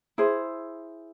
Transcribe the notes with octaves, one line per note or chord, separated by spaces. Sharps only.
E4 G#4 C5